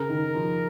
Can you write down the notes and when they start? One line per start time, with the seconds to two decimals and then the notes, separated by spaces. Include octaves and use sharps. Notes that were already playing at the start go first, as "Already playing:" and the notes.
Already playing: C#3 A#4
0.09 D#3
0.35 F3